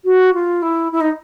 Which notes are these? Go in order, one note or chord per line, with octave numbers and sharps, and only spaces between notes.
F#4
F4
E4
E4
D#4